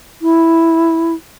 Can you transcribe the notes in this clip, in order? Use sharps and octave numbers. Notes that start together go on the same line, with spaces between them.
E4